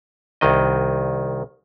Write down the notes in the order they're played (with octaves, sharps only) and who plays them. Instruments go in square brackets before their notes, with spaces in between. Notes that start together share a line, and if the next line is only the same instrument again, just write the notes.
[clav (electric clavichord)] C2 D#3 D#5